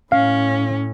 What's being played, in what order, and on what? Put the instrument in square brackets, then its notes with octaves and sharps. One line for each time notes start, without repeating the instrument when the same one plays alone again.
[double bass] A2 [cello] C#4 [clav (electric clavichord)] F5